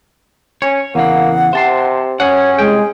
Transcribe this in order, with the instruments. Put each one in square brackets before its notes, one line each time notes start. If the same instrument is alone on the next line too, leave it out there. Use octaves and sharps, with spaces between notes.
[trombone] C#4 [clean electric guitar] C#5
[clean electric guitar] E2 C#3 [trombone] A#3 [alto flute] F#5
[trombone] C3 [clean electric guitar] C5 A5 C6
[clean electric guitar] F#2 G#4 F#5 [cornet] C#4 [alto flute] C#5
[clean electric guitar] C2 C#3 G5 [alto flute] G#3 [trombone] G#4